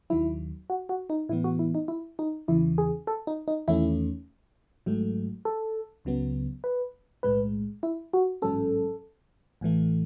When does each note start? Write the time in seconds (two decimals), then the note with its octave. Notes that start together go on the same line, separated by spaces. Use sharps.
0.10 D#2 D#3 F#3 E4
0.70 F#4
0.89 F#4
1.10 D#4
1.29 A2 E3 B3 E4
1.44 F#4
1.59 E4
1.74 D#4
1.88 E4
2.19 D#4
2.48 E2 C#3 E3 E4
2.78 G#4
3.07 A4
3.27 D#4
3.48 D#4
3.68 E2 D#3 A3 C#4 E4
4.86 G#1 G#2 F#3 A3
5.45 A4
6.05 C#2 C#3 F#3 B3
6.64 B4
7.23 B1 A2 G#3 B4
7.83 E4
8.13 F#4
8.42 A1 G#2 F#3 C#4 A4
9.61 A1 A2 E3 A3